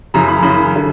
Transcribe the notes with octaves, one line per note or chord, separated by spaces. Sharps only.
F#2 C#3 E3 A#5
B5
F#2 C#3 E3 B5
D3